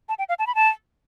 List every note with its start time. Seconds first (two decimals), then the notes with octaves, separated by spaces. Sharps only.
0.09 A5
0.19 G5
0.29 F5
0.39 A5
0.47 B5
0.55 A5